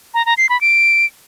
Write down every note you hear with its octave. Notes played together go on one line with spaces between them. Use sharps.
A#5
A#5
C7
B5
D7